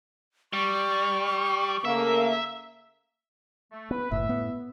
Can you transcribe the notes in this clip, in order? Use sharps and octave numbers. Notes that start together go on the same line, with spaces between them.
G3 C#6
C#3 A3 A#3 E5
A3
B3 B4
F#1 A2 E5
B3